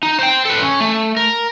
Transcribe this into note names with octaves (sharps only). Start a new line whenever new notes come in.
D#4
C5 G5
A4 B4
C#4
A3
A#4